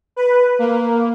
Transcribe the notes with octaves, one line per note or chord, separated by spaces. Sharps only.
B4
A#3